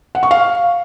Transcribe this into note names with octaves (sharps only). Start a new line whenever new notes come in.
F#5
C#6
F5